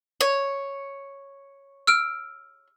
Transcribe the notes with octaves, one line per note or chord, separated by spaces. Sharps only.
C#5
E6 F6 D7